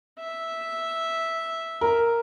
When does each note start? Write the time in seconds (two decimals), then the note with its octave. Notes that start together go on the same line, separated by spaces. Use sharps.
0.19 E5
1.81 A#4